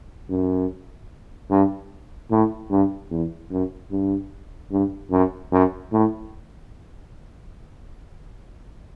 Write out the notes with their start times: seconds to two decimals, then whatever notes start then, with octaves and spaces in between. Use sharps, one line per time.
0.30 F#2
1.51 G2
2.31 A2
2.71 G2
3.11 E2
3.51 F#2
3.91 G2
4.71 G2
5.11 F#2
5.52 F#2
5.92 A2